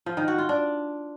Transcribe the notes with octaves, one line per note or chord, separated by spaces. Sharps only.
F3
D#3
F#4
F4
D4